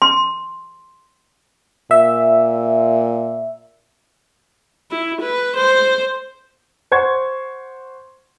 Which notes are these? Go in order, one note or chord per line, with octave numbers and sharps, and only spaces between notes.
C6
A#2 E5
E4
B4
C5
C5 F#5 C6 C#6 G#6